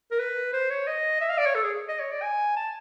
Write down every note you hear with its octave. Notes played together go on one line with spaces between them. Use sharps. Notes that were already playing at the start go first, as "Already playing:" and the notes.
A#4
B4
C5
C#5
D#5
E5
F5
D5
C#5
A4
G#4
D#5
C#5
D5
G#5
A5